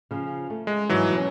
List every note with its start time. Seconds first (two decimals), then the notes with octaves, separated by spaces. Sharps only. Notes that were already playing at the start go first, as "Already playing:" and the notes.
0.11 C#3 F3
0.50 A3
0.67 G#3
0.89 G#2 D#3 E3 F#3 G3
1.11 B2 C#4